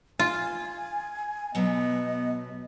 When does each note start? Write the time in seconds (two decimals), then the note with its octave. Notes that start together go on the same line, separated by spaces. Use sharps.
0.19 F4 G#5
1.55 B2 F#3 B3 D#5